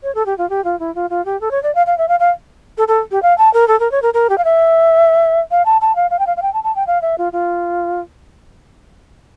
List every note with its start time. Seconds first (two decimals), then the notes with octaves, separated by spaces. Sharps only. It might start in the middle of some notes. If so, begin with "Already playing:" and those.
0.03 C#5
0.15 A4
0.26 G4
0.38 F4
0.50 G4
0.64 F4
0.80 E4
0.95 F4
1.10 F4
1.25 G4
1.41 A4
1.51 C#5
1.63 D5
1.75 F5
1.87 F5
1.98 E5
2.08 F5
2.20 F5
2.78 A4
2.88 A4
3.11 G4
3.23 F5
3.38 A5
3.54 A#4
3.68 A4
3.80 A#4
3.92 C#5
4.02 A#4
4.14 A#4
4.30 G4
4.38 F5
4.44 E5
5.51 F5
5.66 A5
5.81 A5
5.96 F5
6.11 F5
6.19 G5
6.27 F5
6.37 F5
6.42 G5
6.54 A5
6.64 A5
6.76 G5
6.87 F5
7.02 E5
7.18 F4
7.33 F4